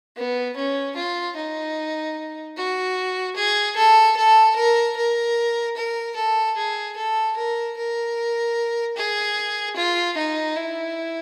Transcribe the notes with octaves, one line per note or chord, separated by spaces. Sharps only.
B3
C#4
F4
D#4
F#4
G#4
A4
A4
A#4
A#4
A#4
A4
G#4
A4
A#4
A#4
G#4
F4
D#4
E4